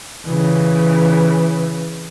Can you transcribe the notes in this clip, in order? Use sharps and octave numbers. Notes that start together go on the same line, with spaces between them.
C#3 E3